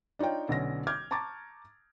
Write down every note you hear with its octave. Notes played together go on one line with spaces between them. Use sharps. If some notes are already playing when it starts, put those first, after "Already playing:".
D4 D#4 F4 C#5 G5
B1 D3 C#4 A#6
D6 F6 G6 G#6
A5 A#5 C#6 D6 G#6 A6